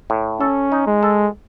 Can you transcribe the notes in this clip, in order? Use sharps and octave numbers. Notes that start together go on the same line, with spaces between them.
A2
C#4 A4
D#4
G#3
A4